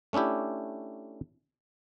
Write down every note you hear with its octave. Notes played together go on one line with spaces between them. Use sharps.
A3 C#4 D4 E4 G4